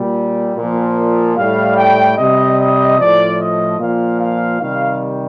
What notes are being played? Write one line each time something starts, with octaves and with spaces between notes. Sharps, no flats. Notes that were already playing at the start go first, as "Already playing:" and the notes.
Already playing: A#2 G3
A#2
F3
A2 G3 F5
G5
C3 G3 D#5
D#5
A2 F3 D5
D#5
A#2 F3 F5
F5
C3 D#3 G3 F5